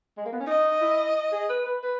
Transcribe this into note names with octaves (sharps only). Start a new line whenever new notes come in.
G#3
A#3
B3
C#4
D#4 D#5
E4
G#4
B4
B4
B4